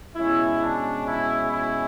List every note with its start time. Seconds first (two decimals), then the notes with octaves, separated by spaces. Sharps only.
0.15 B2 G#3 C#4 E4
0.61 D4
1.07 E4
1.52 E4